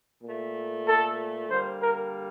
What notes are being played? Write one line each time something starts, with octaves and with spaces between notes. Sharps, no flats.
A#2 A3
A4
D3 G3 A#3 C5
A#4